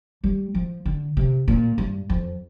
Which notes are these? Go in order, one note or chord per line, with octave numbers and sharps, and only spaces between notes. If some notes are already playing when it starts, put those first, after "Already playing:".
G3
F3
D3
C3
A#2
G2
F2